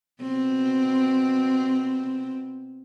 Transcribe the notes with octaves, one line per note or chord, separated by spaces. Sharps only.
B2 C4